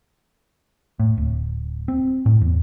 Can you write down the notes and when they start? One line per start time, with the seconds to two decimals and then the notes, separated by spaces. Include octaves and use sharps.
1.00 A2
1.17 D1
1.88 C4
2.26 A2
2.41 E2